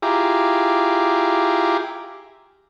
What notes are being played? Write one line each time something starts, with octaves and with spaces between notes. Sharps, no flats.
E4 F4 G4 G#4 A#5 D6